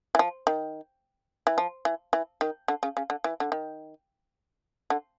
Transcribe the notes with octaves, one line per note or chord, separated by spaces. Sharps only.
E3
F3
D#3
E3
F3
E3
E3
D#3
D3
C#3
C#3
D3
E3
D3
D#3
D3